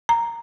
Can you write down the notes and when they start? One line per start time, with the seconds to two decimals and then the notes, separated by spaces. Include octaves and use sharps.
0.09 A#5